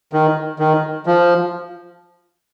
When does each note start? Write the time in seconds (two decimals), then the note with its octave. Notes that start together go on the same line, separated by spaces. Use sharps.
0.13 D#3
0.59 D#3
1.06 F3